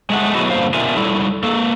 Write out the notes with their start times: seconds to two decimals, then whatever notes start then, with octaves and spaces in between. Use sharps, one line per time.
0.10 G#3 A3 F#5
0.34 F#3 B3 E4 F#4 G#4 D#5
0.50 G2 D3 G#3 A#3 C5 F5
0.74 B2 D4 F4 A#4 E5 G#5
0.97 G3 E4 A4
1.43 A#3 A4